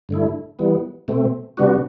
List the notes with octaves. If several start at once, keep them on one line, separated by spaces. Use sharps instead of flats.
G2 D3 A3 E4
E3 G3 B3
B2 A3 C4
C3 G3 B3 D4 F#4